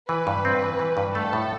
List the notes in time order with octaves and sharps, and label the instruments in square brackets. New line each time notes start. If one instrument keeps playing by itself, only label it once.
[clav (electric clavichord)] E3 [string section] B4
[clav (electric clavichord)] G2
C4
E3
E3
G2
[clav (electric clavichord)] A3 [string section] A4
[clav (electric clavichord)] A2